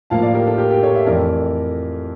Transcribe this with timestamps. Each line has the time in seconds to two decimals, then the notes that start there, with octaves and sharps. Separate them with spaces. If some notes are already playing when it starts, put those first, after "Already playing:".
0.10 A2 F3 A#3 F5 A5
0.22 D5 F5
0.34 G4 A#4
0.47 F4 A4
0.58 G4 A#4
0.71 G4 A#4
0.83 A4 C#5
0.94 C#5 E5
1.06 F2 E3 A3 A#4 D5